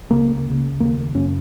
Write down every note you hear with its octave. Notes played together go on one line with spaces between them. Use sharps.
C#2 C#3 A#3
C#2 C#3
D#2 C#3 A#3
F#2 C#3 C#4